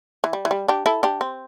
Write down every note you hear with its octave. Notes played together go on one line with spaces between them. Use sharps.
E3
G3
E3
G3
D4 G4
E4 A4
D4 G4
C4